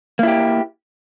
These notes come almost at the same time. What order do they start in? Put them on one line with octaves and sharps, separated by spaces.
A#3 E4 G4